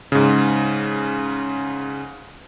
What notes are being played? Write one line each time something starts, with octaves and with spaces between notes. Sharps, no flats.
G#2 C#3